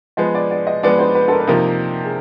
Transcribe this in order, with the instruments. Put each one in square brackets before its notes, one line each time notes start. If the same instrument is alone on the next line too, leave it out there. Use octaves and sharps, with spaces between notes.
[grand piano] F3 G#3 B3 [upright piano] D#5
[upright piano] D5
D5
D#5
[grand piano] F3 G#3 B3 [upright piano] D5
[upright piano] C5
B4
A4
A#4
B4
[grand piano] C3 F3 A#3 D#4 [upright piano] A#4
[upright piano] G#4